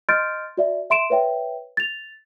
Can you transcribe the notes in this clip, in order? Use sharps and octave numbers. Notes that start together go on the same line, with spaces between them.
D#5 C6 F6 G6 A6 D7
F#4 D5 E5
E5 C6 D7 E7
B4 C#5 E5 G5
A6 F7